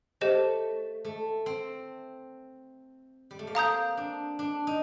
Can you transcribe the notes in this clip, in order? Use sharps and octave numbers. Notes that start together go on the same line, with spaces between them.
A3 G4 C5 D#5
A3
C4
G3
A3
A#3
C4 F5 A#5 D#6 G6
D4
D4
D#4